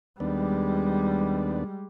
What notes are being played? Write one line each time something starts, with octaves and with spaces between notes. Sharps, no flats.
D#2 G3 G#3 B3 D4